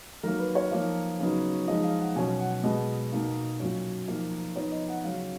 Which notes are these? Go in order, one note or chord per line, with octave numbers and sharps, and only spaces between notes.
D#3 F#3 A#3 A#4
B4
C#5
F3 A#3 D#4
C#3 F#3 B3 D#4
F3 G#3 D#4 D#5
F5
F#5
B2 F#3 C#4 G#5
F#5
B2 G#3 B3 D#5
B2 A#3 D#4
A#2 F#3 C#4
F3 A#3 D#4
F3 B3 D#4 C#5
D#5
F#5
C#3 F#3 C#4 F5